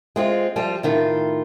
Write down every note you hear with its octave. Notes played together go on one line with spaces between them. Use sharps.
G#3 C4 F4
F3 G3 F4
A2 D#3 F4